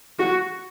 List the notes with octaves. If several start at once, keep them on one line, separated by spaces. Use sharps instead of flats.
F#4